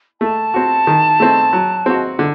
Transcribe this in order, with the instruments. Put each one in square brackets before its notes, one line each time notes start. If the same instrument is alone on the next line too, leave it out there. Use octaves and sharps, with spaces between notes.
[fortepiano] A3 [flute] A5
[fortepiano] C4 F#4
D#3
A3 C4
F#3
C4 F#4
D3